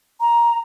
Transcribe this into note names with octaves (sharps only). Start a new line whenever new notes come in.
A#5